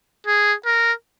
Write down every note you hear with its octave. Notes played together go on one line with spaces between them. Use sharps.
G#4
A#4